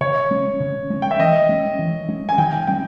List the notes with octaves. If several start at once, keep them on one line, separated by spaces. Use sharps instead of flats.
C#3 C#5
G#3 C#4
C#3
G#3 C#4
G5
E5
E3 D#5
G#3 C#4
E3
G#3 C#4
G#5
D#3 G5
G3 C#4 G5